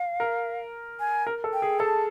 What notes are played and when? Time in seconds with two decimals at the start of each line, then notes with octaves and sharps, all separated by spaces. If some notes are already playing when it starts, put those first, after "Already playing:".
Already playing: F5
0.20 A#4
1.00 G#5
1.27 A#4
1.44 A4
1.53 G5
1.62 G#4
1.79 A4 A5